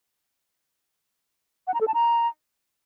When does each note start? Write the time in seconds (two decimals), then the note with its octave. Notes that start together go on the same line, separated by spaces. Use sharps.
1.67 F#5
1.74 A#5
1.81 A4
1.87 A5
1.94 A#5